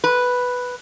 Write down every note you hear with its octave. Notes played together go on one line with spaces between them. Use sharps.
B4